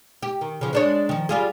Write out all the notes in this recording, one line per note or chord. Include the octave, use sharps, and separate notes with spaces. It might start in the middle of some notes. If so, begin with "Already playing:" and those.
G4
D#3
C#3 F3
G#3 D4 C#5
D#3 F3
G3 F4 G#4